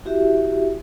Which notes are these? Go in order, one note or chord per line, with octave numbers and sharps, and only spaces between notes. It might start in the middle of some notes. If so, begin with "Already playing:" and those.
E4 F#4 G4 E5